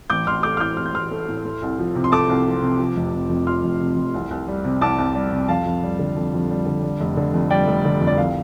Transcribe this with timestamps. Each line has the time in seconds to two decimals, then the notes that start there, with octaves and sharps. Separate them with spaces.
0.10 A1 D6 G6
0.27 A1 C6 F6
0.43 A3 D6 G6
0.57 F6
0.60 A2 D6 G6
0.77 A1 F6
0.86 G6
0.94 A1 C6 F6
1.11 A3
1.29 A2
1.45 A3
1.62 C2
1.79 F3
1.95 C3
2.04 C6
2.12 A3 A5 D6
2.30 C2
2.46 F3
2.62 C3
2.79 F3
2.97 F1
3.13 C3
3.30 F2
3.47 F3 C6 F6
3.64 F1
3.81 C3
3.97 F2
4.14 C2
4.31 C2
4.48 G3
4.65 C3
4.81 C2 A5 D6
4.98 C2
5.15 G3
5.32 C3
5.48 F2 F5 A5
5.66 F2
5.83 G3
5.99 D3
6.16 F2
6.34 F2
6.50 G3
6.66 D3
6.83 G3
7.00 F1
7.17 D3
7.34 F2
7.50 G3 D5 G5
7.67 F1
7.85 D3
8.01 F2
8.07 D5
8.18 C2 F5